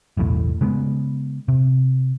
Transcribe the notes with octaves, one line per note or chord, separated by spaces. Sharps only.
F#1 B1 E2 A2
C#3 G#3 A#3 B3
C3